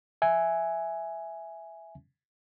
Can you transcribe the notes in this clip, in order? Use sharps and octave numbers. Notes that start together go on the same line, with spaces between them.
E5 G#5